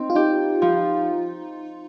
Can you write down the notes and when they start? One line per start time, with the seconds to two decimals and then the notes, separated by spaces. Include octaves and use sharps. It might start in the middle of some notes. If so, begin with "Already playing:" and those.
Already playing: C4 D#4
0.10 F4
0.15 D#4 G4
0.62 F3